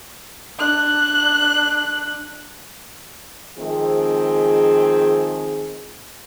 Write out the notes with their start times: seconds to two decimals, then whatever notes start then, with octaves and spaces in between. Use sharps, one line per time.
0.59 D4 F#6
3.57 D#3 F3 G#3 C4 G#4